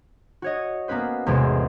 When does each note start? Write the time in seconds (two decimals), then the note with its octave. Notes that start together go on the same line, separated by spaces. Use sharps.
0.42 F#4 C#5 D#5
0.88 A#3 B3 C#4 B4 C5
1.26 A1 E2 C3 G#3